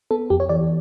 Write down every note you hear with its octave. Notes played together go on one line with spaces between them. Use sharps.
B3 A4
F2 G4
C#5
E3 D5